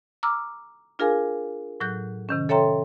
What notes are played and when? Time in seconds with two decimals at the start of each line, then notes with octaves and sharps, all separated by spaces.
0.23 A#5 D6 E6 F6
0.99 D4 F4 G#4 A#4 F5 G#5
1.80 A2 F#3 F#6 G6
2.29 C3 D#3 C#4
2.49 A4 C#5 E5 G5 A#5 C6